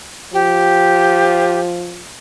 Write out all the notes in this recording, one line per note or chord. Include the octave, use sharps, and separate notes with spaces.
F3 G4